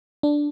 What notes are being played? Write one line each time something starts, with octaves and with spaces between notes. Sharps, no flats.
D4